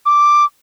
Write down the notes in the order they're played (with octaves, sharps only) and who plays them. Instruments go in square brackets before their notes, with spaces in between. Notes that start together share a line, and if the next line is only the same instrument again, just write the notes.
[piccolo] D6